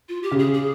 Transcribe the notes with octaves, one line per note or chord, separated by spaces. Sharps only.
F4
G4
C#3
G#4
G#4